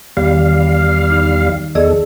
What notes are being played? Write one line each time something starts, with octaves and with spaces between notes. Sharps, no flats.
E2 D#3 G3 F5
D#4
E2 G#4 A4 D5 D#5